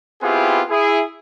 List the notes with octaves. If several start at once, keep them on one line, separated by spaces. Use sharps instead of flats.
B3 C4 E4 F4 G4 G#4
E4 G#4